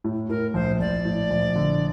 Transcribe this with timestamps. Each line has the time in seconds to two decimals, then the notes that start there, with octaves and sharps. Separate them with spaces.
0.04 A2
0.29 A2 A#4
0.54 A#1 C5
0.80 A#1 D5
1.05 A2
1.30 A#1
1.55 D3